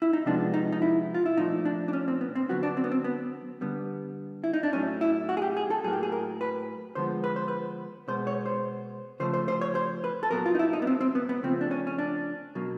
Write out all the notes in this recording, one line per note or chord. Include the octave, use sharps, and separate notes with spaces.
E4
D#4
C3 F3 G#3 B3 D4
D#4
D#4
E4
F4
E4
A#2 F3 A3 D#4
D4
D4
C#4
C4
B3
C4
D3 F#3 B3 F#4
D4
C4
B3
C4
B3
D3 G3 B3
E4
D#4
D4
A2 F#3 A3 C#4
E4
F#4
G#4
G4
G#4
A4
A2 F#3 A#3 G#4
G4
G#4
A#4
B4
D3 F3 G#3 B3 C5
B4
C5
B4
B2 G#3 B3 C5
C#5
C5
C#3 F3 A3 C5
C5
C5
C#5
C5
B4
A4
A#2 F#3 B3 A#4
F4
D#4
E4
D#4
B3
C4
C4
B3
B3
C#3 F3 A3 C4
D4
C#4
C#4
D4
B2 F#3 A#3